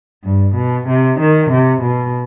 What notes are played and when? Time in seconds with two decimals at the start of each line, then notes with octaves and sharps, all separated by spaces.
0.24 G2
0.55 B2
0.88 C3
1.19 D#3
1.50 C3
1.82 B2